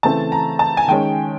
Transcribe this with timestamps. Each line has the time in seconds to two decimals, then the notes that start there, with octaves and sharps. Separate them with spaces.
0.03 C#3 E3 A3 C4 A5
0.32 A#5
0.59 A5
0.77 G#5
0.88 D#3 G#3 C#4 G5